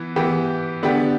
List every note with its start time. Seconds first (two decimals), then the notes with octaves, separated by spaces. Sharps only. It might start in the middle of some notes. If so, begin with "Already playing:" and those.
Already playing: E3 B3
0.16 E3 B3 G4
0.83 D3 B3 D4 G4